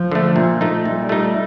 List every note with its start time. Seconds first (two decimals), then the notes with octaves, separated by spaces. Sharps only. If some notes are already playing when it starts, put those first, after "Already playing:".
Already playing: F3
0.12 D3 A3
0.36 A#2
0.61 A3 D#4
0.85 A#2 G3
1.09 A3 D#4